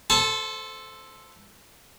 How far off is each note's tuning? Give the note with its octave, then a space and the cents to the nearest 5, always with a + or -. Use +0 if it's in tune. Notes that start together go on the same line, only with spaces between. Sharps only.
A4 +0 C5 +0 A5 -40